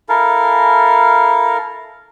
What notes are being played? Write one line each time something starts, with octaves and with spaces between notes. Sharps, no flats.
E4 A4 A#4 F5